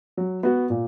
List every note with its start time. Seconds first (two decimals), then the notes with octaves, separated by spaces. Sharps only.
0.17 F#3
0.43 B3 F#4
0.70 A#2